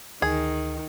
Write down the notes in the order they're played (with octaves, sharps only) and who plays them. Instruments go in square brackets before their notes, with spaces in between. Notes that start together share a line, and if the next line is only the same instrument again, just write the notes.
[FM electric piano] D2 [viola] D#3 [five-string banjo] G#4